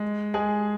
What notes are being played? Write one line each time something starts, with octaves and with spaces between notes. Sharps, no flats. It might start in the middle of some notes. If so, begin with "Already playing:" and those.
Already playing: G#3
G#3 G#4